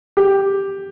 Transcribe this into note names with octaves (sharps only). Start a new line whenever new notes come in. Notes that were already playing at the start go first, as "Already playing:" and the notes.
G4